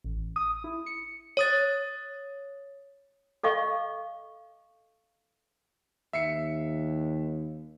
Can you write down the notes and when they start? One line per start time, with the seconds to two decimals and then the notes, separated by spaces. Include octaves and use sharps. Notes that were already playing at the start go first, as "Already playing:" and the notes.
0.04 A1
0.36 D#6
0.64 E4
0.86 C#7
1.37 C#5 D#6 A6
3.43 A4 D#5 F5 C#6
6.13 D#2 E5 C7 C#7